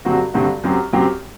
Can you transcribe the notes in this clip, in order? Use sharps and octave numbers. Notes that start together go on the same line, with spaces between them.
G2 D3 F#3 C4 F#4
G2 D3 F#3 C4 F#4
F#2 F#3 C4 G4
F#2 F#3 C4 G4